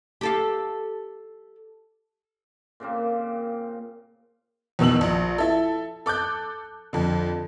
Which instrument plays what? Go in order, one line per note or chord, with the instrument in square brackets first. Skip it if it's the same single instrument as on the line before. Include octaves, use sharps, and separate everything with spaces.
[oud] G4 A4 F5
[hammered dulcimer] A#2 C#3 A#3 C4
[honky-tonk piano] E2 B2 D#3 E6 F#7
A#1
E4 A4
A4 D6 F#6 G6
F2 D3